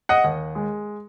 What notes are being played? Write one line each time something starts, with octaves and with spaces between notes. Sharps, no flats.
D#5 F#5
D#2
G#3